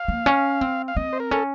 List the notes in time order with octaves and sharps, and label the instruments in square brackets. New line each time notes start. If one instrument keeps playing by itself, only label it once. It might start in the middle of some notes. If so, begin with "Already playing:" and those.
Already playing: [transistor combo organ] F5
[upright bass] A#3
C#4
C4
[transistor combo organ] F5
[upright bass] C4 [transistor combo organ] D#5
[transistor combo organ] C5
A#4
[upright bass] C#4 [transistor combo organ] A4